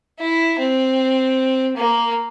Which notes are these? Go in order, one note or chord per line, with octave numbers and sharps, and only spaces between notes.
E4
C4
A#3